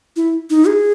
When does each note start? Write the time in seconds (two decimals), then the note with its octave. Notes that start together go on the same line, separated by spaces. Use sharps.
0.16 E4
0.50 D#4
0.67 G#4